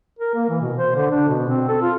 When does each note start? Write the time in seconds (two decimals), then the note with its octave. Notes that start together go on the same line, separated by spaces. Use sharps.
0.19 A#4
0.35 A#3
0.49 E3
0.61 B2
0.77 C5
0.95 D3
1.11 D4
1.28 B2
1.49 C4
1.68 A4
1.82 F4